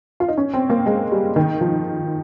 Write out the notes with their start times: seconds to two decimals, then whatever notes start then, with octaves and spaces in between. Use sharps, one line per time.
0.20 F4
0.28 D#4
0.37 C#4
0.53 C4
0.70 A#3
0.86 G#3
1.11 G3
1.36 D#3
1.61 F3